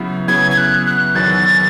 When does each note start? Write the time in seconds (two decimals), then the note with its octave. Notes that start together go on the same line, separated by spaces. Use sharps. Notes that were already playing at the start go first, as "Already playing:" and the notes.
Already playing: C#3 F#3 B3 E4
0.28 C#3 F#3 B3 E4 G#6
0.51 G#6
0.58 F#6
0.87 F#6
1.15 E2 D#3 F#3 A6